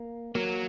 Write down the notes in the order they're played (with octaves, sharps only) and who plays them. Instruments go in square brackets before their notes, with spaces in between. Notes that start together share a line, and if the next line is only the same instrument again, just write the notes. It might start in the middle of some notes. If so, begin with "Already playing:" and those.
Already playing: [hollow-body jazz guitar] A#3
[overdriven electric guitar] F#3 [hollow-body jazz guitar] A#3